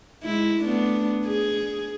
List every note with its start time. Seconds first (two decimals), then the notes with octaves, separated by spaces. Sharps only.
0.24 G#3 E4
0.63 A3 B3 D4
1.26 G#4